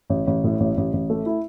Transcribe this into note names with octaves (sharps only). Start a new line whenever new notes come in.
A1
A1
A2
A1
A1
A1
A3
E4